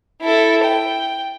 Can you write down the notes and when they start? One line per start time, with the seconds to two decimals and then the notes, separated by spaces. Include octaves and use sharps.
0.22 E4 A4
0.64 G5